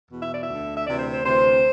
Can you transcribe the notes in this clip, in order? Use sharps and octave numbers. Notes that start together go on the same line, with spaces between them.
E2 B2
E5
D5
E5
D2 D3
E5
D2 C3 E3 D5
C5
C5
D2 C3 E3 C5